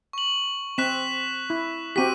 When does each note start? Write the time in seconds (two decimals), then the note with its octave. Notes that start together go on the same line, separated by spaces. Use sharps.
0.13 C#6 F#7
0.78 C4 F#6 B6 E7
1.50 E4
1.96 C4 F#4 G4 B6 D#7